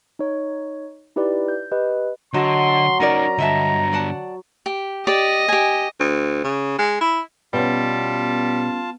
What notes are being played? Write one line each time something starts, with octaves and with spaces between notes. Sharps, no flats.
D#4 C#5
D#4 E4 G4 B4 D5
G6
G4 B4 D#5
D3 F#3 D#5 A5 C6
C#4 D#4 A#4 C#5 D5 A#5
G2 D3 D#5 E5 A5
D5 F#5 A5
G4
G4 D5 D#5
G4 G#5
D2
C#3
G#3
E4
B2 G3 B3 C#4 F4 A5